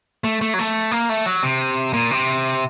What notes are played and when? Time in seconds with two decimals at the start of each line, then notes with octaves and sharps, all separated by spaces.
0.24 A3
0.41 A3
0.54 F#3
0.59 A3
0.91 A#3
1.09 A3
1.26 F#3
1.43 C3
1.93 A#2
2.11 C3